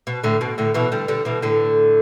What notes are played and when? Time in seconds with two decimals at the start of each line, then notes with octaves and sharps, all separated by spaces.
0.07 B2
0.24 A2 D3
0.41 B2
0.58 A2 D3
0.74 B2 E3
0.92 D3 G3
1.08 D3 G3
1.25 B2 E3
1.42 A2 D3